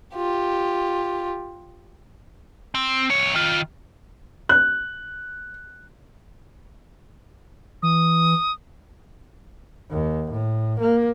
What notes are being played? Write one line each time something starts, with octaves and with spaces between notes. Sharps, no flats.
F4 G4
C4
C2 C#5
D#3 F4
F#6
E3 D#6
D#2
A2
A#3